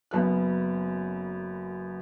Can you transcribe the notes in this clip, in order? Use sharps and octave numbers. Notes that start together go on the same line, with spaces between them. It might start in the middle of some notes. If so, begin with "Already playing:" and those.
F#1 F#2 B3 F#6